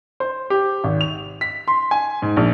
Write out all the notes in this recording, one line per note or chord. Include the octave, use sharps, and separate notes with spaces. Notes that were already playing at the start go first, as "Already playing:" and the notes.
C5
G4
G#1
F7
B6
C6
G#5
G#2
A#1